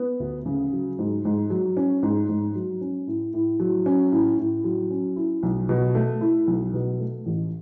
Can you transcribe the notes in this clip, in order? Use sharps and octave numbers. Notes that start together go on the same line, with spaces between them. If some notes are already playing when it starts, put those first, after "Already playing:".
Already playing: B3
D2
C#3
F#3
G#2
G#2
F#3
C#4
G#2
G#2
F#3
C#4
A2
A2
F#3
C#4
A2
A2
F#3
C#4
E4
B1
B2
A3
E4
B1
B2
A3
A1